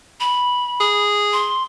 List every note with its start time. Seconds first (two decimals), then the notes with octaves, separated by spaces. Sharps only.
0.20 B5
0.80 G#4
1.33 C6